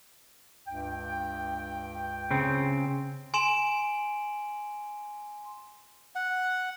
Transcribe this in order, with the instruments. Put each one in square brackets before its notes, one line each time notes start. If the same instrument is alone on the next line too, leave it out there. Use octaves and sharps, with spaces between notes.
[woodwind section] C#2 G2 G5
[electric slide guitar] C#3 C4
[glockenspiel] G#5 C6 D7 E7 F#7
[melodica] F#5